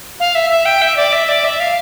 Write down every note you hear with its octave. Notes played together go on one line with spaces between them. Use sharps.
F5
E5
E5
G5
E5
D5
E5
D5
E5
F5